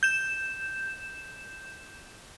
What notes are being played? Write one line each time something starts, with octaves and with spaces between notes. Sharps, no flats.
G6 E7